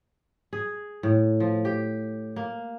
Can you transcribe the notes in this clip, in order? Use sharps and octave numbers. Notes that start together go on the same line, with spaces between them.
G#4
A2
F3
G4
A#3